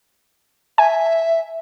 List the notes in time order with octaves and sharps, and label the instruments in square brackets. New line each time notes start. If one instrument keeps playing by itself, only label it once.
[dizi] E5 [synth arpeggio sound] G#5